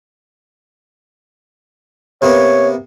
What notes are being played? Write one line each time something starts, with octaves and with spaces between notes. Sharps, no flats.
C3 A#3 B3 C#5